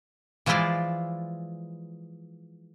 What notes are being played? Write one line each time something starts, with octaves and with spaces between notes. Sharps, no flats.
E3 F3 G#3 E4 F4 D5